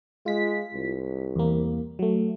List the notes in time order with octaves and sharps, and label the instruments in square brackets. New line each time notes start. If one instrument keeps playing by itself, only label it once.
[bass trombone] G#3 [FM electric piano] F4 B6
[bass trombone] C2
[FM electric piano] E2 A#3
F#3 A3